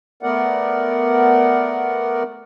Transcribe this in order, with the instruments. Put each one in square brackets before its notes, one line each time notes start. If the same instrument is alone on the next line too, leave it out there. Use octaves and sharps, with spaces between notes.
[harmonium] A3 B3 A#4 D5 F#5